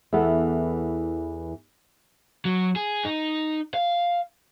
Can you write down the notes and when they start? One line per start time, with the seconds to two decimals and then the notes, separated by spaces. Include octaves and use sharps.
0.13 E2 E3 B3 A4
2.45 F#3
2.76 G#4
3.05 D#4
3.74 F5